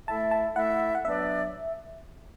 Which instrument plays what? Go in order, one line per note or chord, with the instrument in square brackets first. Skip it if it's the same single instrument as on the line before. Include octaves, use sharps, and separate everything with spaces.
[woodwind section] A3 E4 A4 E5 [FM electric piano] A5
[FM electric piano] A5
[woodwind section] A3 E4 A4 E5 [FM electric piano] F#5
[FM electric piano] F#5
[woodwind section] F#3 B3 D4 B4 D5 [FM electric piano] E5